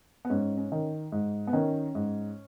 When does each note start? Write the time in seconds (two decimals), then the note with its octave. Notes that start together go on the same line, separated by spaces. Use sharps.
0.25 B3
0.30 G#2 C#4
0.57 C#4
0.72 D#3
1.12 G#2
1.47 B3
1.53 D#3 C#4
1.95 G#2